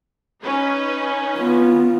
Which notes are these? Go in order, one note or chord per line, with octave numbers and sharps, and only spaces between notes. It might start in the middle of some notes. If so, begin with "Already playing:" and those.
C#4 D#4 B4
B3 F4